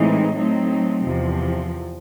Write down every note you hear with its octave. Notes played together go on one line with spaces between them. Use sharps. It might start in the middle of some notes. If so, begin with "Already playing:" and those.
Already playing: A2 E3 G#3 C4 D#4
F#3 A3 C4 D#4
E2 C3 F3